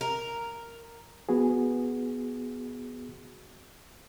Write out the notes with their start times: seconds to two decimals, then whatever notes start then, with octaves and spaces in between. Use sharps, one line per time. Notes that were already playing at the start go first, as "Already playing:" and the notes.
0.01 A#4
1.29 B3 F#4 G#4